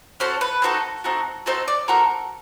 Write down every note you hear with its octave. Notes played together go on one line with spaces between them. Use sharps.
C#4 F#4 A4 C5
B4
C4 D#4 F#4 A4
C4 D#4 F#4 A4
C4 D#4 F#4 A4 C5
D5
C4 D#4 F#4 A4 A#4